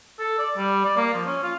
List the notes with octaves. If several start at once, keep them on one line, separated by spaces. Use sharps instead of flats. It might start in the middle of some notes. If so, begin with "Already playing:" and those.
A4
D5
G3
D5
A#3
F3
C#4
F4